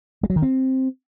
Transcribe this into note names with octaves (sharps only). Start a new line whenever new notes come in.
G#3
F#3
D#3
C4